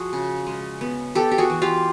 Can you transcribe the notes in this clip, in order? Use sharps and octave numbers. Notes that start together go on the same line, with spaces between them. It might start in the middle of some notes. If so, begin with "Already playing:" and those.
Already playing: F3 F#4 G#4
C#3
G#3
B3
B3 G4 A4
G4
F#4 G#4
E3
F4 G4